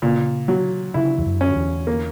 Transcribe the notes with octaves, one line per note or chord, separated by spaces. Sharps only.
A#2 C#3
F#3
C#3 E4
E2
F#2
C#4
E2
A#3